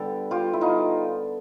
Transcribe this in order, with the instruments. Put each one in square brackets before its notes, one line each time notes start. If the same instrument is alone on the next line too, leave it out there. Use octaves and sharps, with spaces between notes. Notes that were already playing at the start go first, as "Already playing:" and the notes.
Already playing: [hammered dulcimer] D3 G3 B3 G4 A4
F4 G4
E4
D#4 F4